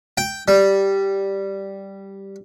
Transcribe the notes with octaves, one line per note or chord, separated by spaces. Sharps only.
G5
G3